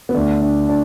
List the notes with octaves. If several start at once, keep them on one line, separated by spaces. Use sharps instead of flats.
B3
D2 D3 D4
D4
D4